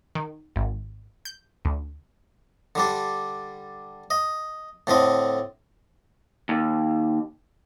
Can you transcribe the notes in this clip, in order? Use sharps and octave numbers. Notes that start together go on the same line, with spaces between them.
D#3
G#1
G6
D2
D3 G3 D4
D#5
A2 D3 C4 D#5
D#2